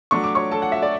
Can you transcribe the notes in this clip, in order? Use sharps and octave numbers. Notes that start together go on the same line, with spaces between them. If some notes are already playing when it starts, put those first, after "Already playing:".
F#3 A3 D4 C#6
D6
C#5 C#6
A4 A5
F#5
E5
D5